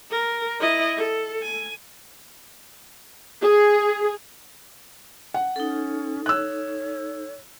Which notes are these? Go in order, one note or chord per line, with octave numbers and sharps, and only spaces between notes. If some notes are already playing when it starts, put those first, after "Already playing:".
A#4
E4 D#5
A4
G#5
G#4
F#5
C#4 D#4 A4
C#5 E6 F#6